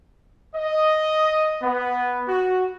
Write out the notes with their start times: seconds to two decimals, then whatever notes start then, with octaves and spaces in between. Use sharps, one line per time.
0.55 D#5
1.62 B3
2.28 F#4